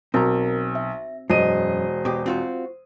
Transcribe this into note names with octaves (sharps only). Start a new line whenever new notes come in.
B1 C4 A#4 A#5
E5
E1 F#2 C5 D#5 C7 D#7
B2 G4
C4 F4 F#4